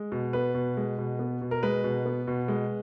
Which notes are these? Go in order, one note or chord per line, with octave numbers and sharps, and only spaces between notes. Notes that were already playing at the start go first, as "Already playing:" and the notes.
Already playing: G#3
B2
B3 B4
B2
G#3
B2
B3
B2
A#4
G#3 B4
B2
B3
B2
G#3